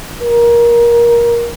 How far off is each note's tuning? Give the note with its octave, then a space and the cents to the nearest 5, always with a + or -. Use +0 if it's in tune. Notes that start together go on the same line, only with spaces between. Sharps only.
A#4 +20